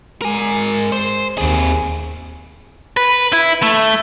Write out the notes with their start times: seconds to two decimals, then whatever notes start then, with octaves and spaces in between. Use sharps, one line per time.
0.22 G#3 A#4 G#5
0.92 C5
1.38 D#2 C4 G#4
2.97 B4
3.33 E4
3.62 A3